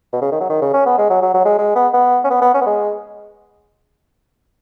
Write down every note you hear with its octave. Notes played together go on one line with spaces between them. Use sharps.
B2
C#3
D#3
F#3
D#3
C#3
C#4
B3
G#3
F#3
F#3
F#3
G#3
G#3
B3
B3
C#4
B3
B3
C#4
B3
G#3